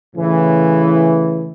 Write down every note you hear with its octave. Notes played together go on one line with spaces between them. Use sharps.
A2 C#3 E3